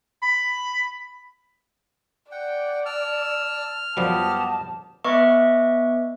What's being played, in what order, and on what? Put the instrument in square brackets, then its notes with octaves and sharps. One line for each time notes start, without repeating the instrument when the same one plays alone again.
[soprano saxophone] B5
[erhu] D5 [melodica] F#5 G5
[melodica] A5 E6 [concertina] F6
[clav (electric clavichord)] F#2 F3 G3 [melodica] B3 G4 D#5 [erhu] A5
[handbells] B3 B4 D#5 E5 C#6 D6